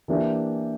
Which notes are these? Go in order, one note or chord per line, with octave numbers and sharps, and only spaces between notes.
E3 A#3 D4 G4